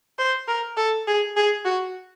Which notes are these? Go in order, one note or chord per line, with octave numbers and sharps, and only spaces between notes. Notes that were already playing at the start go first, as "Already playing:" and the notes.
C5
A#4
A4
G#4
G#4
F#4